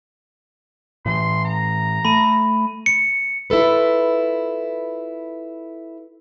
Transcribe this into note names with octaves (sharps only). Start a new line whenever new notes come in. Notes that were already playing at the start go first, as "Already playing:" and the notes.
A2 E3 C6
A#5
A3 B5 D#7
C#7
E4 F4 A4 B4